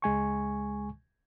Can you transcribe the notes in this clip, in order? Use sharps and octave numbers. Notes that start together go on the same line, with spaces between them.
C#2 G#3 G#5 C#6